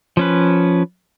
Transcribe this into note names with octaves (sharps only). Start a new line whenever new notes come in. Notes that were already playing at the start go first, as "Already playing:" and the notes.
F3 C#4 B4